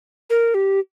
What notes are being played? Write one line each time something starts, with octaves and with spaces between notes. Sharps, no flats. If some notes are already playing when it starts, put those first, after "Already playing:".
A#4
G4